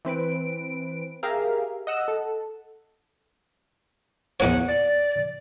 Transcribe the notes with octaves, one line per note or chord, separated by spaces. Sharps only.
E3 C4 B4 D7
G4 G#4 A#4 E5 F5
D#5 F#5 E6
A4
E2 A#3 C#5 F#5
D5